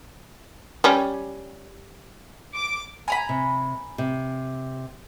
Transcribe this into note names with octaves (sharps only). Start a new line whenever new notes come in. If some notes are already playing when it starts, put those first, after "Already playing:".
G3 C#4
D6
G#5 A#5 B5
C3
C3